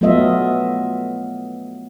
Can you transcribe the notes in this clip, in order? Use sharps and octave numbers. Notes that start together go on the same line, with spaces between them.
F#3 A3 B3 F4 D#5 E5